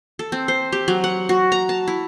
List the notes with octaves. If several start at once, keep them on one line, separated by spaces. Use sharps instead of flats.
A4
C4
C5
G4
F#3
F#5
F#4
A#5
A5
E4